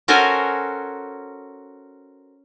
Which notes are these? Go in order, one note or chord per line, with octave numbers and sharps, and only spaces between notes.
C#4 F#4 A4 A#4 C5 G#5